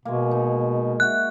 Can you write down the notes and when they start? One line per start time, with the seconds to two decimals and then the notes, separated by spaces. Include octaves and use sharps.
0.05 B2 G#3 A#3
0.31 D#4
1.00 F#4 E5 F#6